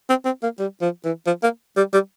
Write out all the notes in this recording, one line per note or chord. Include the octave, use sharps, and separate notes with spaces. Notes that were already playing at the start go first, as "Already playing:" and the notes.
C4
C4
A#3
G3
F3
E3
F3
A#3
G3
G3